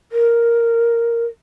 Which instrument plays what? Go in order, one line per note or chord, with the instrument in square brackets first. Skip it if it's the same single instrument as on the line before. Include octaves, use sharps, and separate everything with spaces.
[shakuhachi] A#4